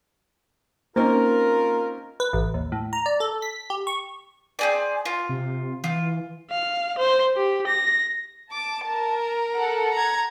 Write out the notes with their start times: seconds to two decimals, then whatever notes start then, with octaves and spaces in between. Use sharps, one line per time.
0.96 A#3 C4 C#4 D#4 F4 A#4
2.20 B4
2.33 A1
2.54 D#2
2.72 A2
2.93 A#5
3.06 D5
3.20 A4
3.42 B6
3.70 G4
3.87 C#6
4.59 C4 G#4 D5
5.05 F4
5.29 C3
5.84 E3 F4
6.50 F5
6.98 C5
7.36 G4
7.67 A#6
8.52 A5 D6
8.87 A#4
9.56 A4 F#5
9.93 A#5 G#6